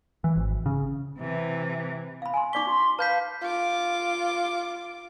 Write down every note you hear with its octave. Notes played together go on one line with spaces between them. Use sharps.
E3
G#1
C#3
C3 E3
F5 B5
G#5 C6
D#4 D5 C#6 D6 B6 G7
F#4 C6
B4 F5 A5 B5 G6 B6
F4 D6